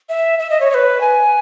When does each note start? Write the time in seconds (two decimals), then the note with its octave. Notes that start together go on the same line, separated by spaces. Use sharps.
0.09 E5
0.39 E5
0.50 D#5
0.60 C#5
0.70 C#5
0.74 B4
1.01 G#5